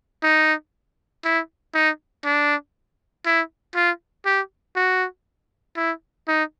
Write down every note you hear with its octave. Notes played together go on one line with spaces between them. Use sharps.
D#4
E4
D#4
D4
E4
F4
G4
F#4
E4
D#4